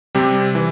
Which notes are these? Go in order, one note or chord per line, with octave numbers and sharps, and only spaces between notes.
C3 G3 C4 G4
E3